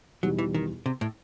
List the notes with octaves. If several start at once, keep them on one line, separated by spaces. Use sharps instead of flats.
E2 B2 F#3 G3 D#4 G4
E3
D#3
C3
A2